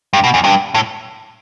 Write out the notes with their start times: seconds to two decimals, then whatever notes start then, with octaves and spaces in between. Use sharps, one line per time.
0.13 G2
0.24 B2
0.34 E2
0.44 G2
0.75 A2